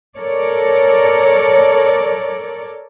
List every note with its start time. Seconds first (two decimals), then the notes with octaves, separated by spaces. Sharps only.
0.17 A4 A#4 C#5 D5